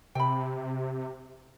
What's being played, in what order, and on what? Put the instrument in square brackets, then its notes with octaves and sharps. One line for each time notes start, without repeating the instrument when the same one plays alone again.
[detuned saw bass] C3 [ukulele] G5 B5